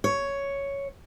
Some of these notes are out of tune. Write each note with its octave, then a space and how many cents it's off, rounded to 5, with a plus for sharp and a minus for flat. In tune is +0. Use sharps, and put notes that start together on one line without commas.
C#5 +5